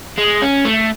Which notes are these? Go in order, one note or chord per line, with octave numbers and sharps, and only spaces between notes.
G#3
C#4
A3